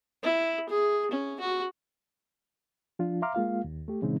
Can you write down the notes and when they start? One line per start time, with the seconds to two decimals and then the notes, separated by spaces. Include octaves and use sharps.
0.23 E4
0.69 G#4
1.11 C#4
1.40 F#4
2.99 F3 D4 F4
3.22 E5 F5 A#5 C6 D6 F6
3.35 G#3 A#3 F4 F5
3.64 D#2
3.88 A3 G4
4.02 A#2 C#3 E3 G#3 C4 D#4